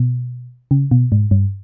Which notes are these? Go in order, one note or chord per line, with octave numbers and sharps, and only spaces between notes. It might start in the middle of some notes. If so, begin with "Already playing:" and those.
Already playing: B2
C#3
B2
G#2
G2